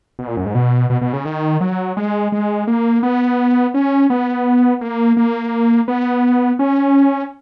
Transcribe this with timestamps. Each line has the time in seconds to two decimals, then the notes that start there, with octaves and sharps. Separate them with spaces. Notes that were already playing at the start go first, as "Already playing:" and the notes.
0.19 B2
0.27 A#2
0.37 F#2
0.46 G#2
0.55 B2
0.90 B2
1.01 B2
1.13 C#3
1.25 D#3
1.61 F#3
1.97 G#3
2.32 G#3
2.67 A#3
3.03 B3
3.74 C#4
4.10 B3
4.81 A#3
5.17 A#3
5.88 B3
6.59 C#4